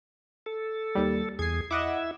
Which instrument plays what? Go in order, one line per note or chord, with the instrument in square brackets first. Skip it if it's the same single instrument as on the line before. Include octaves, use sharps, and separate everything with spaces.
[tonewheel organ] A4
[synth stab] D#2 G3
[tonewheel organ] E2 G#4 [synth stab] G#6 C7
[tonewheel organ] E4 E5 [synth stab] D#5 F#5 D6